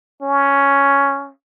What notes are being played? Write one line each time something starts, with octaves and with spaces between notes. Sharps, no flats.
C#4